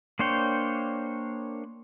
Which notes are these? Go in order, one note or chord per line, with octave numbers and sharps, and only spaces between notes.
A#3 D4 C5 C#5 G5